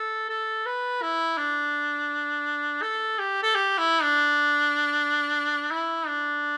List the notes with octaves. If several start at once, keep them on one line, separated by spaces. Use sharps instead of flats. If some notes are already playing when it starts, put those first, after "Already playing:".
Already playing: A4
A4
B4
E4
D4
A4
G4
A4
G4
E4
D4
E4
D4